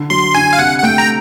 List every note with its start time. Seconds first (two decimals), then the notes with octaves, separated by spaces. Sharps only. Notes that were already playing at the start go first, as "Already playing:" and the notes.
Already playing: D3
0.10 F#3 C6
0.35 D3 G#5
0.53 F5
0.59 C3 F#5
0.78 F#5
0.83 A3 G5
0.98 A#5